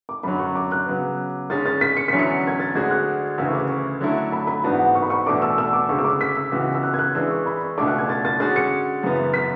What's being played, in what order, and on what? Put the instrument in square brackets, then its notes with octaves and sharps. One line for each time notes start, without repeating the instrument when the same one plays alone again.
[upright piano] D6
[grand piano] F#2 D3 F#3 [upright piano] B5
[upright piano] C#6
D6
F#6
[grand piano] C#3 F#3 B3
[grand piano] D3 G#3 C#4 G#4 [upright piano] A6
[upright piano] A6
B6
C#7
[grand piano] E2 D3 F#3 C#4 E4 [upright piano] B6
[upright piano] C#7
G#6
A6
[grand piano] D2 D3 G#3 D4 F#4 [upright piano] G#6
[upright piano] F#6
[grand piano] D2 C#3 E3 [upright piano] E6
[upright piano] C#6
D6
C#6
[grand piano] D3 F#3 A3 E4
[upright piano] B5
B5
[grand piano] G#2 E3 B3 D4 F#4 [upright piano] A5
[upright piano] F#5
C#6
B5
C#6
[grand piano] E2 B2 A3 D4 A4 [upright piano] D6
[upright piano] E6
E6
D6
[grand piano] D2 C#3 G#3 [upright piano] C#6
[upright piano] E6
D6
B6
E6
[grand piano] C#2 C#3 E3 B3 F#4
[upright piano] E6
F#6
G#6
F#6
[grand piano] E3 G#3 D4 [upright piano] E6
[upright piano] C#6
B5
C#6
[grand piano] C#2 B2 A3 D4 [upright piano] D6
[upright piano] F#6
G#6
A6
A6
[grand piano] D3 G#3 C#4 F#4 [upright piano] A6
[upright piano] C#7
[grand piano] F#2 C#3 E3 B3
[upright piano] B6